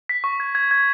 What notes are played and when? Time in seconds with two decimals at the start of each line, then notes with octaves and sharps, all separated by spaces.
0.09 B6
0.24 C#6
0.40 G#6
0.55 G#6
0.71 G#6